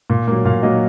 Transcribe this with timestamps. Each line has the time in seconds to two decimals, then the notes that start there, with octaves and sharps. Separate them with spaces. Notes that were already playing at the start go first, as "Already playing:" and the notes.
0.10 A#2
0.28 F#3 A#3
0.45 A#2 F5
0.63 F#3 A#3 D#5